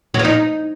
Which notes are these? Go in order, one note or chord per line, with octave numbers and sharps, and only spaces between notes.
F#3
F3
D#4